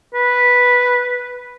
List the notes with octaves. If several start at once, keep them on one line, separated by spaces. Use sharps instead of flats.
B4